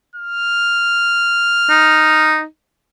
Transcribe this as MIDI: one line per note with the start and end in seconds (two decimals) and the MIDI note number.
0.16 2.31 89
1.70 2.44 63